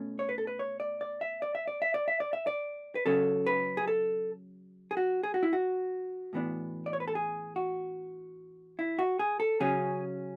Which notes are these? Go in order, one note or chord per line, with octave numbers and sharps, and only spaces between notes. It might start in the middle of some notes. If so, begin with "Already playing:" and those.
Already playing: B2 A3 C#4
C#5
B4
A4
B4
C#5
D5
D5
E5
D5
E5
D5
E5
D5
E5
D5
E5
D5
B4
C#3 F#3 C#4 A4
B4
G#4
A4
G#4
F#4
G#4
F#4
E4
F#4
A2 E3 B3 D4
D5
C#5
B4
A4
G#4
F#4
E4
F#4
G#4
A4
C#3 F#3 C#4 G#4